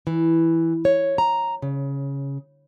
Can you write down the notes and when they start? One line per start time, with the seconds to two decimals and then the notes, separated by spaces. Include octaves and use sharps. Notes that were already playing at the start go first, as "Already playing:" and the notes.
0.07 E3
0.85 C#5
1.18 A#5
1.62 C#3